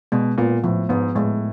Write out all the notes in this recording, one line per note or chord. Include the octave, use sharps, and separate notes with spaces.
B2 G#3
A#2 B3
A2 F3
G#2 B3
A2 G#3